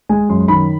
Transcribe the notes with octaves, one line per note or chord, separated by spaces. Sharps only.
G#3 G#5
F#2 C6
C6
D#3 B5